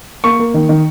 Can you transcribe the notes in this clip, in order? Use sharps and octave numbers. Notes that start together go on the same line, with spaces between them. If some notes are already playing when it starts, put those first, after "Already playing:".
A#3 C#6
A#3
D#3
D#3